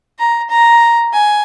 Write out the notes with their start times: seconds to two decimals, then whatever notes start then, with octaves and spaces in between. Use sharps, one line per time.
0.19 A#5
0.50 A#5
1.13 G#5